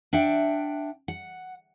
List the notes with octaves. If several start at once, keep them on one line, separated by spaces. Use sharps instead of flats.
D4 E5 F#5 G5
F#5